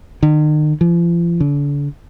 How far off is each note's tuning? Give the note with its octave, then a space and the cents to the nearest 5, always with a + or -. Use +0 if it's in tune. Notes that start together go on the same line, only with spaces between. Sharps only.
D#3 -40
F3 -40
D3 -40